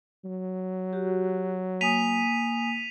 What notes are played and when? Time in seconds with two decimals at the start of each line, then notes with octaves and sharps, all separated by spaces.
0.25 F#3
0.93 F#4 G4
1.81 A#3 G#5 D#6 B6 D#7 F7